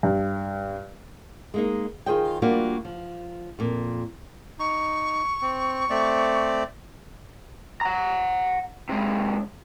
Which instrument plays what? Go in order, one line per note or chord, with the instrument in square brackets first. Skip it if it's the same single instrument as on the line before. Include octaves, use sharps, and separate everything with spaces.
[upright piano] G2
[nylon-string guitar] G#3 A#3 D#4
D#3 F4 G#4 C5 D#5 G5
F3 G3 A#3 D4 F4 F#4
F3
F2 A#2
[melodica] D#4 [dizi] C#6
[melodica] C4
A3 C4 D5
[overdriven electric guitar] F#5 A#5
C3 G#3